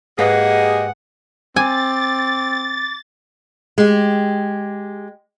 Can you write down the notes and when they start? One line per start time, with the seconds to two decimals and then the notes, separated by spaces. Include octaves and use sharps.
0.19 G#2 A#3 G4 G#4 B4 D#5 F5 F#5
1.56 C4 G#5 D6 A6
3.78 G#3 G4